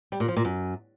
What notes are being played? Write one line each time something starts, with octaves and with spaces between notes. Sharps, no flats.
G3
A#2
F3
A#2
F#2